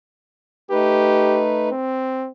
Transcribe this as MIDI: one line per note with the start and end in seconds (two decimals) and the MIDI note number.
0.71 1.69 57
0.71 1.69 63
0.71 1.42 67
0.71 1.69 71
1.71 2.29 60